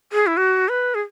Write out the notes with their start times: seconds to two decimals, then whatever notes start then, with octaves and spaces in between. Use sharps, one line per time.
0.13 G#4
0.27 E4
0.37 F#4
0.69 B4
0.95 G#4